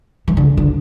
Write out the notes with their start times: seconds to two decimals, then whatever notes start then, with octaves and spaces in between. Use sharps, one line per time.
0.28 E3
0.37 D3
0.57 D3